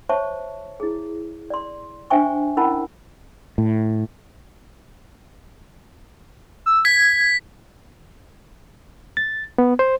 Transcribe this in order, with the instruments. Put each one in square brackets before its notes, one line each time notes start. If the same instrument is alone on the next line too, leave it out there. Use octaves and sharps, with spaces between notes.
[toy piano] C5 C#5 E5 A5 C#6
E4 G#4
D5 C6
D4 C5 E5 G5 G#5 C#6
C#4 E4 A#4 F#5 A5 B5
[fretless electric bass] A2
[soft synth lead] E6
[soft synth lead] G#6 [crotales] B6
[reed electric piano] A6
B3
C5